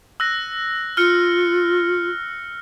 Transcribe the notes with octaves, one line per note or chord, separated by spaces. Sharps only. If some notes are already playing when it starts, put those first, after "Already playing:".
E6 F#6 A#6
F4 F6 F#6 C#7